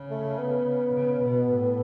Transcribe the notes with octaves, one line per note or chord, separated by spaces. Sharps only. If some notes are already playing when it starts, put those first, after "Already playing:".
Already playing: C#3
A3
B3
C#3
B2
A2